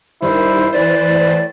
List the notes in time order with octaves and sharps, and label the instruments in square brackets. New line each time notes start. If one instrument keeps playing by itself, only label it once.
[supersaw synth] G2 D#3 C7 [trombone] E4 [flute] C5
[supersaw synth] E3 B4 C5 [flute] D5
[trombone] A2